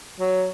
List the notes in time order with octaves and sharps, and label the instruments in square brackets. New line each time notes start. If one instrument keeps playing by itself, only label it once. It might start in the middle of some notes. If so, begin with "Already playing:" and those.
[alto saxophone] F#3